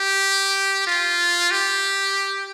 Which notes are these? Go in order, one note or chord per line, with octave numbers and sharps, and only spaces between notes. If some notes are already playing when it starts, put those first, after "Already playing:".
Already playing: G4
F4
G4